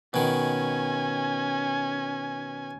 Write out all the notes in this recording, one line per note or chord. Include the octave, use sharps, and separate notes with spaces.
B2 D#3 C#4 G#5